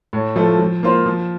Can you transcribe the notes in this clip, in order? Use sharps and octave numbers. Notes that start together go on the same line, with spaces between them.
A2
F3 A3
F3
A#3 F4 C5
F3